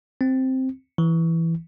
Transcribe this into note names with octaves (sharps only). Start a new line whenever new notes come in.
C4
E3